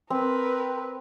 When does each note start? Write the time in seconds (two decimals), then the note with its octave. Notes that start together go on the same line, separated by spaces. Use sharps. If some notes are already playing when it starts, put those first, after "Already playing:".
0.10 C4 A#4 B4